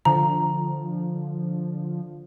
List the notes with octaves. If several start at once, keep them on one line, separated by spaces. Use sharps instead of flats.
D3 F3 A#5